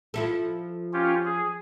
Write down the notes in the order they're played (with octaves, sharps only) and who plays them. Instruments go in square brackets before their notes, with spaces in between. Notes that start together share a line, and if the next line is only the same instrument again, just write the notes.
[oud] F3 E4 A4
[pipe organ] C#4 F4 G4
G#4